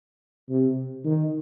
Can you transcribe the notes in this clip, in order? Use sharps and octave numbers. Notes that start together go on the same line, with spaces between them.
C3
D#3